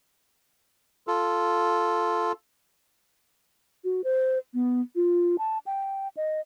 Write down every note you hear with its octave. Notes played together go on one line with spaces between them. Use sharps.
F4 A4
F#4
C5
B3
F4
A5
G5
D#5